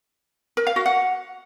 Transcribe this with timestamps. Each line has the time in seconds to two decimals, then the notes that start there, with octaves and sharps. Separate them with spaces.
0.57 A#4
0.67 F5
0.76 F#4
0.86 F#5